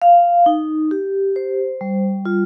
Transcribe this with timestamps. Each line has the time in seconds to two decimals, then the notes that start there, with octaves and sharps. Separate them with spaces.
0.02 F5
0.46 D#4
0.91 G4
1.36 C5
1.81 G3
2.25 F4